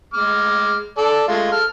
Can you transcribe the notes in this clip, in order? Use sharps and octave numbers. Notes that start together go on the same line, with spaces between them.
G#3 D6 F6
A4 D5
G#3 A3 F4
A4 F6